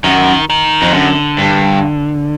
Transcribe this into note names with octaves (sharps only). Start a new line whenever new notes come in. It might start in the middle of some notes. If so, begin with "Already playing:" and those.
F#2 D#3
D#3
F2
F#2 D3
G2